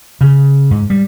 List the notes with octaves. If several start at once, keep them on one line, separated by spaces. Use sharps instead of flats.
C#3
G#2
G3